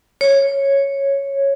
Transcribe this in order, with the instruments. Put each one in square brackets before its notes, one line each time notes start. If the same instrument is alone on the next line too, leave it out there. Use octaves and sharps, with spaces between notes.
[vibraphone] C#5